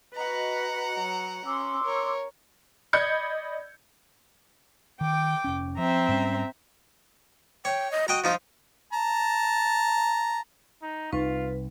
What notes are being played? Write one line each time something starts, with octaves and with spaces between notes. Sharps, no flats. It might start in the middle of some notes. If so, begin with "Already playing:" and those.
F#4 B4 D#5 F#5 A#5
F#3
C#4 C6 D6 E6
A#4 C#5
D5 D#5 B5 G6 G#6 C#7
D#3 G5 D6
F1 C#4
F3 C4 E5 A#5
G#2 G3 C#4
C#5 G5
D#5
F#4 D#5 G5 A#5
F3 D#4 F4
A5 A#5
D#4
C2 D#4 F4 B4